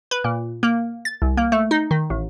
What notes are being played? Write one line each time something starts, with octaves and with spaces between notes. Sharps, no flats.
B4
A#2
A#3
A6
C2
A#3
A3
D#4
D#3
A1